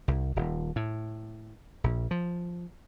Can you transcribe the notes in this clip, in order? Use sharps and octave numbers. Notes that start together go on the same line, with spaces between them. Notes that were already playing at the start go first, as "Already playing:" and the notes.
C2
D#1
A2
A#1
F3